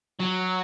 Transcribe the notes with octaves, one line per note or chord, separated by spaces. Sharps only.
F#3